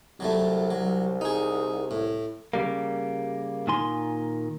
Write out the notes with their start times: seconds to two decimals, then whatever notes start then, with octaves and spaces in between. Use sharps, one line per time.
0.20 C2 F#3 G3 A3
0.70 F#3
1.21 D#4 G#4
1.91 A2
2.53 C#3 G3 A#3
3.67 A#2 D#3 G#5 C6